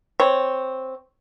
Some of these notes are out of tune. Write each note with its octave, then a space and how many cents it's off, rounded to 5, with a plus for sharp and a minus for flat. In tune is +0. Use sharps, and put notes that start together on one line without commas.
C4 +0 C#5 -5